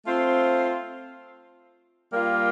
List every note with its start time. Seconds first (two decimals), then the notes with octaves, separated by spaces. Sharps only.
0.06 A3 C4 F4 C5
2.12 G3 A#3 F4 A#4